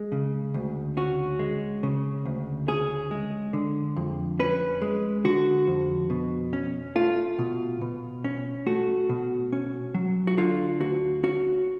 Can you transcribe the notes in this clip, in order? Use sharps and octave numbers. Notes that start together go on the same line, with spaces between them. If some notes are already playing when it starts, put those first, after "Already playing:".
Already playing: G#3
C#3
D2
C#4 F#4
G#3
C#3
D2
C#4 G#4
G#3
D3
F2
C#4 B4
G#3
D3 F#4
F2
B2
C#4
A3 F4
B2
B2
C#4
A3 F#4
B2
C#4
F#3
F#4
D3 F4
D2 F#4
C#4 F#4